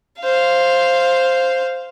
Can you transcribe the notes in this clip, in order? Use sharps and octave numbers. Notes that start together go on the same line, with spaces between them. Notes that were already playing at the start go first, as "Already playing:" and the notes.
C5 F5